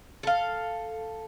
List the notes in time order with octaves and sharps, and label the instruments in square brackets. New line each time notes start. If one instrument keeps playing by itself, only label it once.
[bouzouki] A4 F5